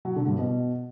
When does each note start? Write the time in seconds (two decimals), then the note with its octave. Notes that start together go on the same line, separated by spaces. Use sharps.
0.05 F#3
0.16 D3
0.27 G2
0.39 B2